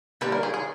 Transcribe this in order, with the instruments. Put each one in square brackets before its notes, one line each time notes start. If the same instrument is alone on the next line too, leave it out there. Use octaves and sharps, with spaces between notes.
[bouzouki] D3 G3 A#3 [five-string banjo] B4
[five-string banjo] A#4
G#4
G#4